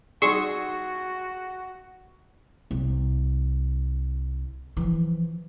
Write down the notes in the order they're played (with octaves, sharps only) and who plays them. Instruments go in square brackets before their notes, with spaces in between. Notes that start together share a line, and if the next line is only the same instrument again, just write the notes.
[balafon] G3 D#4 D5 [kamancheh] F#4 [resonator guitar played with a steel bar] G#4 [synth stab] C6 C#6 E6
[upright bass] C2
E3 F3